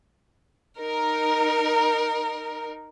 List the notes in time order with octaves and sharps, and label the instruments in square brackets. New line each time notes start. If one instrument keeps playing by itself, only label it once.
[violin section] D#4 A#4